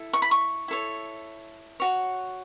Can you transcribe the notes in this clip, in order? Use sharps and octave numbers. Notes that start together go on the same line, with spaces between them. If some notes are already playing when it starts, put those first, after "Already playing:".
Already playing: E4 A4
C#6
B5
C#6
E4 A4 C#5
F#4 C#5